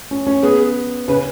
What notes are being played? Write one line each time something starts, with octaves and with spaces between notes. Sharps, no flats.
C#4
C#4
B3 G#4
C#3 B4